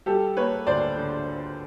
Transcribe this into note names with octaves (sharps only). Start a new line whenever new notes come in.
G3 G4 A4
A#3 B4 C#5
D2 C5 D5
D3